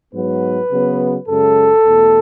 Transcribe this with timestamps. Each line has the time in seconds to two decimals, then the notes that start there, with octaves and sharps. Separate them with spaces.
0.13 G#2 F#3 B3 B4
0.71 C#3 F#3 B3
1.28 F#2 C#3 G#3 A4
1.85 E2 B2 A3